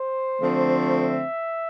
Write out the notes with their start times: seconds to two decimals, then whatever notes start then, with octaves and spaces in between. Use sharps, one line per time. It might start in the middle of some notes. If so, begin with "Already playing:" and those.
Already playing: C5
0.41 D3 F3 A3 C4
0.93 E5